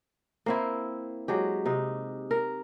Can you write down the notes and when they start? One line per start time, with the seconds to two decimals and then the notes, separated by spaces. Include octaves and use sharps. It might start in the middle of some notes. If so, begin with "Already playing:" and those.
0.46 A#3 C4 E4
1.28 F#3 G#3 G4
1.66 C3 D#4
2.31 A#4